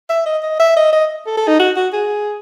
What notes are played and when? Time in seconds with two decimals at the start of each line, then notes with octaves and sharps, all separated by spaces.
0.10 E5
0.26 D#5
0.43 D#5
0.60 E5
0.76 D#5
0.93 D#5
1.26 A4
1.37 A4
1.48 D#4
1.60 F#4
1.76 F#4
1.93 G#4